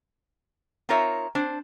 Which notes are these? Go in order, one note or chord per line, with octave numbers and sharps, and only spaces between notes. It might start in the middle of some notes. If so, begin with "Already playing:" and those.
C4 D#4 F4 A#4 C#5 E5
C4 D4 C5